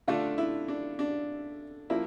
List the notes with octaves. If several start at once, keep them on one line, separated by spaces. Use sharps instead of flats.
D3 A3 D4 F4
E4
D4
D4
F3 A#3 E4